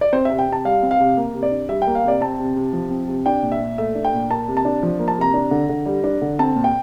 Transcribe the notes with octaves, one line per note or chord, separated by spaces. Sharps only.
D5
C4 C5
C3 E5
G5
C3 A5
G3 F5
C4
F5
C3
A#3
C3
D5
D4
G3 E5
G5
A#3
F5
C3 D5
C4 A5
C3
C3
F3
C4
C3
D4 G5
A#2
E5
A#2
A3 E5
D4
G5
A#2
A#3 A5
C3
A5
D4
F3
A#3
A5
C3 A#5
D4
D3
D3
G3
D4
D3
C4 A5
A#2
G5